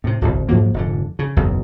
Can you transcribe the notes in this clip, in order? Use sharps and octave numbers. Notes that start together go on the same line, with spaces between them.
A2 C3
D1 G1 C2
G#2 F3 F#3 A#3
F1 G#2 D3
C#3
F#1 B1 E2